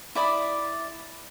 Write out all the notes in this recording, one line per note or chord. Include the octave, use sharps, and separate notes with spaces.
E4 D5 B5 D#6